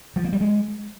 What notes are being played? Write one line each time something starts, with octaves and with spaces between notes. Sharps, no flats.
F3
A#3
G3
G#3